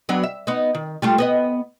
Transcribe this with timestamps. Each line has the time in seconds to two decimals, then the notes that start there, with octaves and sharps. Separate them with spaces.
0.09 F#3 B3 D4
0.23 E5
0.47 B3 D#4
0.75 D#3
1.02 G3 A3 F4
1.18 B3 B4 D#5